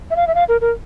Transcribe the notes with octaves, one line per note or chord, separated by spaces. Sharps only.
E5
F5
E5
F5
A#4
A#4